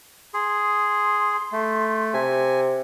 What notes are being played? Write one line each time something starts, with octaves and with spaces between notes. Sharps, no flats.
G#4 C6
A3
C3 G#5